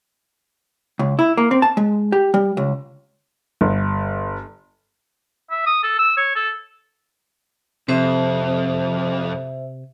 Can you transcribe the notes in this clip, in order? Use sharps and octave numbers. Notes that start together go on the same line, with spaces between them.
C#2
E4
A#3
C4
A5
G#3
G4
G3
C#2
G1
E5
D#6
A4
E6
C#5
A4
F2 C3 C5 E5